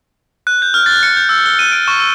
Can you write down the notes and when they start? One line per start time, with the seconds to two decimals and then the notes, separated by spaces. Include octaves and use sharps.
0.47 F#6
0.62 G6
0.74 F6
0.86 A6
1.03 C#7
1.17 G6
1.29 E6
1.46 G7
1.59 D#7
1.72 D7
1.88 C#6
2.00 E6